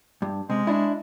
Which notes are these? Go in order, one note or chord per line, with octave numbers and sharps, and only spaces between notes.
G2
C3 G#3
D4 E4